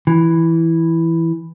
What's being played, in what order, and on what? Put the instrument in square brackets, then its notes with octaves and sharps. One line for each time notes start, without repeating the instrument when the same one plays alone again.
[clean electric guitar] E3